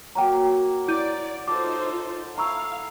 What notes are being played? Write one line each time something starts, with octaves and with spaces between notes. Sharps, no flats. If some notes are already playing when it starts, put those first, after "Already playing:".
F#3 A#3 G5 A#5
E4 D5 G6 D#7
D#4 F4 A4 C5 D6
E4 F5 A#5 C#6 E6